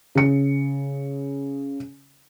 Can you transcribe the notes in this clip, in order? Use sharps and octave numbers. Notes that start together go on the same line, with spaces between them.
C#3 C#7